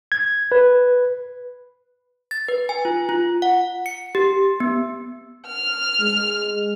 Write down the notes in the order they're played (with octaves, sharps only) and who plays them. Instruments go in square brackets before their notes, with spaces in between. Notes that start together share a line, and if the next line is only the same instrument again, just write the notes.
[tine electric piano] G#6
B4
[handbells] A6
B4
G#5
F4
F4
F#5
C#7
G4
B3
[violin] F6
[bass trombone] G#3